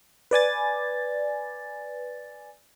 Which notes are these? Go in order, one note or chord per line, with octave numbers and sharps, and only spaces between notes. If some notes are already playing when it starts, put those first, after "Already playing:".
B4 D5 G#5 A6